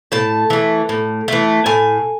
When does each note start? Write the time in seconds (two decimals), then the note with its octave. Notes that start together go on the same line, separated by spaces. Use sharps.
0.12 A2 A5
0.50 E3 A3
0.89 A2
1.28 E3 A3
1.66 A2 G#5